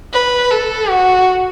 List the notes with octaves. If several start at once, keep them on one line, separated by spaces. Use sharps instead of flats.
B4
A4
F#4